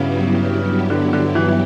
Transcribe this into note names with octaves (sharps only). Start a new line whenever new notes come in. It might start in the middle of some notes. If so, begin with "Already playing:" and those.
Already playing: G2 C#3 F#3 B3 E4 G4
D3
D3
E3
E3